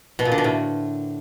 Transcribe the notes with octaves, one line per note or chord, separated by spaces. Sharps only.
B2
A#2
D3
B2
A2